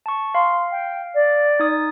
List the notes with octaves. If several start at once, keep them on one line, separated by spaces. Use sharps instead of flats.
A5 C#6
F5 C6
G5
D5
D#4 D#6 A6